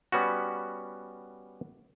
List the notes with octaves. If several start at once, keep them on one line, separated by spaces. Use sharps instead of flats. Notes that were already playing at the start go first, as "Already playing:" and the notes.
G3 B3 C#4 F#4